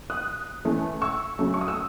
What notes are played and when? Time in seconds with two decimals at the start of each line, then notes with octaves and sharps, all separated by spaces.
0.10 D#6 F#6
0.65 E3 A3 C#4
1.02 C#6 E6
1.39 C#3 F#3 A3 C#4
1.54 C#6
1.61 D#6
1.68 E6